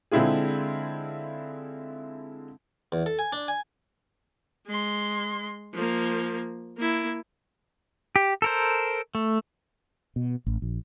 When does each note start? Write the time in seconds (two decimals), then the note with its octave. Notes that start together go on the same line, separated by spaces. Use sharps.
0.12 D3 G#3 C4 E4 F4 G#4
2.92 E2
3.06 A4
3.19 G#5
3.33 D4
3.48 G#5
4.67 G#3 C6
5.73 F3 A#3
6.77 A#3 E4
8.16 G4
8.42 A4 A#4 C5
9.15 A3
10.16 B2
10.46 A1
10.62 A#1